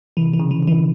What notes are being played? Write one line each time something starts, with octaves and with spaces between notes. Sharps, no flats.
C3 E3
E3
C#3
E3
D3 E3